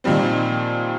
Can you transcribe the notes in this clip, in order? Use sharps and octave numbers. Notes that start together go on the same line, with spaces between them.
A#2 D#3 F3 G3 C4